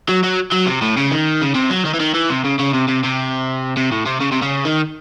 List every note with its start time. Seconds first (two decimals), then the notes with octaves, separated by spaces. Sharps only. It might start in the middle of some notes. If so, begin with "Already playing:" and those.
0.09 F#3
0.23 F#3
0.52 F#3
0.67 C3
0.82 A2
0.97 C#3
1.11 D#3
1.42 C#3
1.55 C3
1.71 F#3
1.85 D#3
1.94 E3
2.00 D#3
2.14 E3
2.30 C3
2.44 C#3
2.59 C#3
2.73 C3
2.88 C3
3.03 C3
3.77 C3
3.92 A2
4.06 C3
4.21 C#3
4.32 C3
4.42 C#3
4.65 D#3